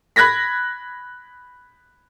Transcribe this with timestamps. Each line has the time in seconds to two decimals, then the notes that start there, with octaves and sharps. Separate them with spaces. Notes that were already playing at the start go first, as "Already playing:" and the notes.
0.16 B5 F#6 G#6 A#6 B6